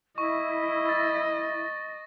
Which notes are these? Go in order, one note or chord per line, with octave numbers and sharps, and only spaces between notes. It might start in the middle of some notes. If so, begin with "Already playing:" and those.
E4 D#5 C#6
A6 A#6